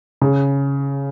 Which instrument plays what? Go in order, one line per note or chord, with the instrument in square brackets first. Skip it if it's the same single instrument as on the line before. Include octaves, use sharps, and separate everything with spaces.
[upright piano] C#3